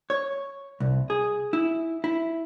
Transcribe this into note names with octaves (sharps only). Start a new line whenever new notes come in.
C#5
C2
G#4
E4
E4